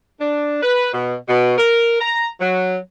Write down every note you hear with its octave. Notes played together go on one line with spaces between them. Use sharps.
D4
B4
B2
B2
A#4
A#5
F#3